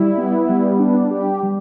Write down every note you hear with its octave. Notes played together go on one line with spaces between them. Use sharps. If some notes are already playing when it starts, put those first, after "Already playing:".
Already playing: G3 E4
B3
G3
D4
G4
G3